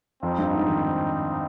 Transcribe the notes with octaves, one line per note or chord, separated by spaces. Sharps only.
F2 G3 C4 D#4
G2
G#2
D#3